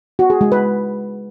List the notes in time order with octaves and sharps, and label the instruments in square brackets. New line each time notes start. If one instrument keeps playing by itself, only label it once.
[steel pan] F#4
G#4
G#3
B4